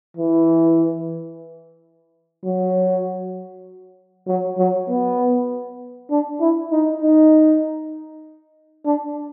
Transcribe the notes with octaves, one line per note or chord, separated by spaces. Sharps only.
E3
F#3
F#3
F#3
B3
D4
E4
D#4
D#4
D4